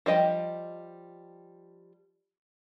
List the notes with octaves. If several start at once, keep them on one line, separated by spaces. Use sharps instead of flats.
F3 G3 D#5 G5